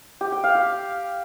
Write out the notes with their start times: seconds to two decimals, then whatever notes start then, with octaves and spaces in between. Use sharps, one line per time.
0.21 G4
0.32 G5
0.44 F5
0.55 G4